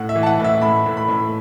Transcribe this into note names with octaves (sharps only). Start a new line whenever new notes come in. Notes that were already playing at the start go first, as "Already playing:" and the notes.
Already playing: A2 F#5
E5
E3
A5
F#5
A2
E5
A2 B5
A2
B5
A2